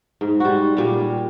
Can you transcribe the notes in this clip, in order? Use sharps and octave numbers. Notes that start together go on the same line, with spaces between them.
G#2
G3 F#4
A#2 G3